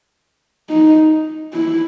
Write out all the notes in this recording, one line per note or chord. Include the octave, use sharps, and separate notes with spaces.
D#4
E4